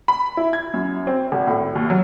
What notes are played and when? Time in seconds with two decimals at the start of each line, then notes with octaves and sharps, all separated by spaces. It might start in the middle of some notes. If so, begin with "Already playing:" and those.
0.08 B5
0.37 E4
0.53 G#6
0.74 F#2
1.07 C4
1.32 G#1
1.47 A2
1.75 D#2
1.90 F#3